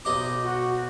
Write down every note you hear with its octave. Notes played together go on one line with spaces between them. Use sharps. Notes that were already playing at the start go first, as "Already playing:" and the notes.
B1 D#5 D6
F#4